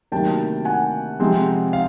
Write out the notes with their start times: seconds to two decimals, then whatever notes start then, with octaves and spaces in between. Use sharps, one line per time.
0.12 D2 C3 D#3 F#3 A#3 G5 A5
0.65 F#5 G#5
1.20 C3 F3 G#3 C4
1.73 F5